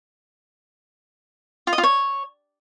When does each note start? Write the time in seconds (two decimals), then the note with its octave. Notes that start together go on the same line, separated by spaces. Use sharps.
1.67 F4
1.73 D#5
1.78 F4
1.83 C#5